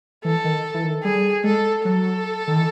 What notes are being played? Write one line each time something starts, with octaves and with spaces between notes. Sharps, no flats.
E3 A4
D#3
E3
D#3
G3 G#4
G#3 A4
F#3 A4
D#3
E3